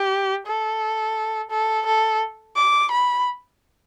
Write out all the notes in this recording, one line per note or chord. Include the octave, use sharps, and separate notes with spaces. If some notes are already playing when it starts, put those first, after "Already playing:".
Already playing: G4
A4
A4
A4
D6
B5